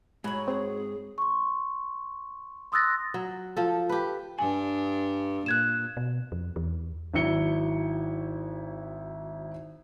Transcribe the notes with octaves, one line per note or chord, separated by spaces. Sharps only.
G#2 F#3 C#5 B5
C4 G#4
C6 C#6
C6 D#6 E6 F#6 A6 A#6
F#3
F3 A4
G4 B4
G2 D4 G#5
A#2 F#6 G#6 E7
B2
F2
E2
G#1 F#3 E4 E5 C#7 G7